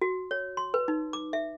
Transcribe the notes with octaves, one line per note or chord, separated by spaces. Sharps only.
F#4
C#5
C6
B4
D#4
D6
E5